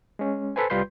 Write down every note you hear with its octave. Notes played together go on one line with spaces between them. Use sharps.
G#3 C#4
A4 B4 C5 G#5
C2 G3 F4 B4 C6 G6